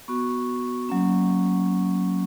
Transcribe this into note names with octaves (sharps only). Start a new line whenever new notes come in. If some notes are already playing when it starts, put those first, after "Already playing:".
B3 F#4 C#6
F#3 A#3 C#4